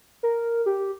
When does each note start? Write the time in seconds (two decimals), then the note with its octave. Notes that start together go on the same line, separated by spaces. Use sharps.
0.23 A#4
0.66 G4